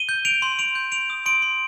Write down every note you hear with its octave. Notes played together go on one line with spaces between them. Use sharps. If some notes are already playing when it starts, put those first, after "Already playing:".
Already playing: D#7 G7
G6
G6 D7 F7
C6
C6 D7 F7
G6
C6 D7 F7
D#6
C6 D7 F7
C6